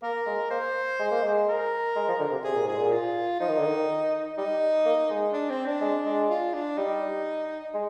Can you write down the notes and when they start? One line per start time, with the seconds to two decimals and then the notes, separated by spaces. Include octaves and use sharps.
0.02 A#3 A#4
0.26 G#3
0.50 A#3 C5
0.99 G#3
1.12 A#3
1.23 G#3
1.48 A#4
1.96 G#3
2.08 F3
2.19 D3
2.31 C3
2.44 C3 G#4
2.55 A#2
2.66 G#2 G#4
2.78 A#2
2.92 F4
3.40 F3 D#4
3.48 D#3
3.57 D3
3.66 D#3
4.37 G3 D#4
4.86 A#3
5.10 G#3
5.33 D4
5.50 C4
5.66 D4
5.81 G#3
6.06 G#3
6.30 F4
6.54 D4
6.77 G3 D#4
7.74 G#3